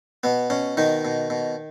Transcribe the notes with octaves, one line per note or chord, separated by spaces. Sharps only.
B2 B3
B2 C#4
B2 D#3 D#4
B2
B2